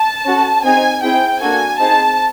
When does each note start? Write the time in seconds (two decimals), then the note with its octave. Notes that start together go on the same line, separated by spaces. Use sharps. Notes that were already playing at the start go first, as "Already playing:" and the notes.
Already playing: A5
0.25 C#4 F#4 A4
0.64 C4 D#4 G#4 G#5
1.02 C4 E4 G#4 G5
1.41 A#3 D4 F#4 A4 G#5
1.79 C4 D#4 G#4 A5